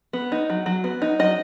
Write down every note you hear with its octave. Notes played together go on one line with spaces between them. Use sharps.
B3
D#4
F#3
F#3
B3
D#4
F#3 D#5